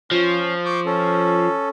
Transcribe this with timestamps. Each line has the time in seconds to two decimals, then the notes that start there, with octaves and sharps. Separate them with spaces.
0.11 F3 C#4
0.65 C#6 D6 G6
0.86 C#4 A4